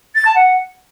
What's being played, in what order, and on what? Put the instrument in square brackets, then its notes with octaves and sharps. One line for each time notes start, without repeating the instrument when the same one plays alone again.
[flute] A6
A5
F#5